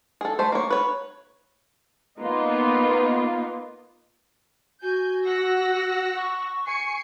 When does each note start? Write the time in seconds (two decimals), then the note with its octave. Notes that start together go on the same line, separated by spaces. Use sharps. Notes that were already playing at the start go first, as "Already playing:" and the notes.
0.21 G#4 A4
0.39 A3 C5
0.52 A#3 C#5
0.70 B4 C#5
2.19 A#3 B3 D#4 F4
4.82 F#4 G#5 G6
5.26 F#5 E6 A#6
6.16 C#6
6.66 G#5 C7 C#7